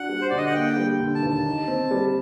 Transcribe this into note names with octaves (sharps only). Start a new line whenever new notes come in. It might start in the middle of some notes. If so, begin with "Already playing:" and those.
Already playing: D4 F#4 F#5
G3
C5
D3 D5
D#5
F#5
A#3 G5
G3
D3
A5
D#2
A5
D#4
C4
G3